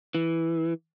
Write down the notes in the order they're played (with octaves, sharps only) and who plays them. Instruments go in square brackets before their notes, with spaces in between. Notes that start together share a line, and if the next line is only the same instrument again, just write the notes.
[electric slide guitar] E3